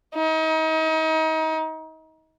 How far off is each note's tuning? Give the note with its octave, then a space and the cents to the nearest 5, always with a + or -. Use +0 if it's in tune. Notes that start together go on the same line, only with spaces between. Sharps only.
D#4 +35